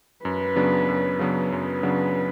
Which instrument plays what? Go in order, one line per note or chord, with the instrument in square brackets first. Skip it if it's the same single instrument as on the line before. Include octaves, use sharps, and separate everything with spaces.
[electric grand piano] F#2 [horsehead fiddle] B4
[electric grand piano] C#3 F#3 B3 D4
F#2
C#3 F#3 B3 D4
[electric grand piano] F#2 [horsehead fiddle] B4
[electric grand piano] C#3 F#3 B3 D4